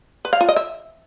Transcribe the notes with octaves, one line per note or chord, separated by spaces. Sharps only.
B4
F5
F4
D#5
E5